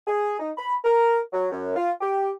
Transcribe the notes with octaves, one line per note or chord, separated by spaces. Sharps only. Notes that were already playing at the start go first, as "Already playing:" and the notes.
G#4
D#4
B5
A#4
F#3
F#2
F4
G4